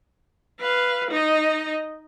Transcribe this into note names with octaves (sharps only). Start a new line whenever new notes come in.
B4 F5
D#4 D#5